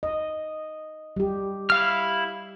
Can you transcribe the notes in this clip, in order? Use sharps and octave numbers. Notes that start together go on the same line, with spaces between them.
D#5
G3 G4
E4 F5 F6